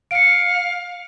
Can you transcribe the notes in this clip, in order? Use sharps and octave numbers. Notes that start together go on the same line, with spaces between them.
F5 C#7 D7